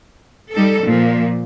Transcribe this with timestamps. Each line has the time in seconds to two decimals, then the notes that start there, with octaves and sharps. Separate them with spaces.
0.52 G3 D#4 A4
0.84 A#2 F3